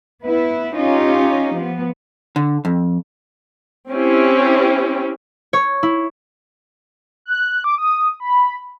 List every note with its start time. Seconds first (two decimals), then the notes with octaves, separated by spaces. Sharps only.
0.24 B3 E4 B4
0.75 C#4 D#4 F4 G4
1.55 F3 B3
2.36 D3
2.65 F2
3.91 C4 C#4 E4 G4
5.53 C#5
5.83 E4
7.26 F#6
7.64 D6
7.78 D#6
8.20 B5